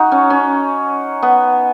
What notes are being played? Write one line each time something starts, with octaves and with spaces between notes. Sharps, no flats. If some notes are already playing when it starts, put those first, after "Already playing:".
Already playing: D#4 F#4
C#4
C#4
B3